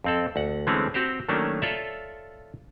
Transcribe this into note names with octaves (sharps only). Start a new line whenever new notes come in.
F2 C4 A4
D2 F#5
D3 E3 G#3 A3 C4 C#4
C4 F#4 G4 C5
D#3 F#3 A3 A#3 C#4 D4
F4 A4 C#5 D5 E5